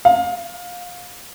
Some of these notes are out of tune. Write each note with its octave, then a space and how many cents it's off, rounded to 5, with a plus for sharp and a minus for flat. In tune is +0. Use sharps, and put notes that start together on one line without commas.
F5 +25